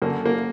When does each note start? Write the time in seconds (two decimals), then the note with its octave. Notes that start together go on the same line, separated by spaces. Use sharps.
0.02 F#2 D3 A#3
0.26 A#3